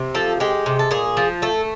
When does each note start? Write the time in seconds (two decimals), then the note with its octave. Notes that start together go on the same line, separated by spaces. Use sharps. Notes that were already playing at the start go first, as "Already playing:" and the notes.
Already playing: C3
0.15 F3 A4
0.40 G#3 G4
0.66 C3
0.79 A4
0.91 A#2 G#4
1.17 F3
1.42 A3 A4